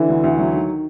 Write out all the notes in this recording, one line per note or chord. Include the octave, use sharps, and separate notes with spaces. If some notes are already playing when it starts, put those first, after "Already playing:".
Already playing: D3 E3 E4
D2
D2
F#3
D#3